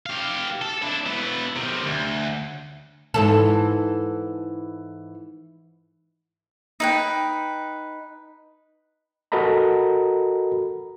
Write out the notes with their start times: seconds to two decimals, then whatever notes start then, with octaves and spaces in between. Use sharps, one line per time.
0.06 G4 F5
0.61 A4
0.82 D4 E4
1.06 B2 E4
1.56 C3 D#3
1.86 D2
3.14 G#2 E3 A4
6.80 D#4 B4 G5
9.32 F#4 A4 A#4 D#5 A#5 B5